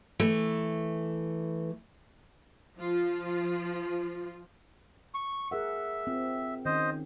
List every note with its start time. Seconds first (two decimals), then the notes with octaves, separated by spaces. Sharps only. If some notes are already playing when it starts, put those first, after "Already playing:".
0.20 E3 A3
2.79 F3 F4
5.14 C#6
5.51 G#4 A#4 E5 F#5
6.07 C4 F4
6.65 D#3 C#4 C5 D#5